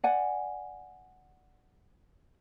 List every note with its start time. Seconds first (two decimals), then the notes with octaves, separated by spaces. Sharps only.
0.04 D5 F#5 G#5